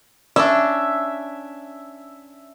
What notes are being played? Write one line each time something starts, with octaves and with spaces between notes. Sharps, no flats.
C#4 D4 E5